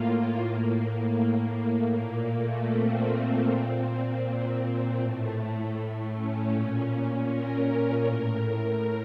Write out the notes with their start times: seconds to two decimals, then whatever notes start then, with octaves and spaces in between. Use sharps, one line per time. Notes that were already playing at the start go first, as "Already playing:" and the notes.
Already playing: A2 A#3 F4
0.41 A2
1.94 A#2 A#3
2.32 A3
2.70 C4
3.47 A#2
4.99 A2 A3
5.76 A3
6.14 C#4
6.52 A#2 C#4
7.28 A#4
8.05 A2